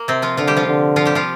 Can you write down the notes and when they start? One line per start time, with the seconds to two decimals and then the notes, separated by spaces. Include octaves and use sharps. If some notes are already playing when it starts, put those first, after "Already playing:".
Already playing: A#3
0.08 C3 C4
0.22 F3 F4
0.37 D3 F3 F4
0.47 G3 G4
0.57 F3 F4
0.67 D3
0.96 F3 F4
1.05 G3 G4
1.15 F3 F4